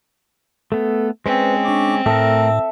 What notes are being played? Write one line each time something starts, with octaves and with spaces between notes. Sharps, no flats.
A3 B3 A4
G#3 C4 C#4 B4 C5
D4 C#6 D6
A2 A3 A4 A#4 E5